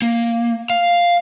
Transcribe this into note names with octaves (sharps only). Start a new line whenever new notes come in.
A#3
F5